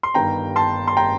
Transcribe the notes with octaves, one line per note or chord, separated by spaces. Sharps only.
C6
G1 G2 D#3 G5 A#5
A5 C6
C6
G5 A#5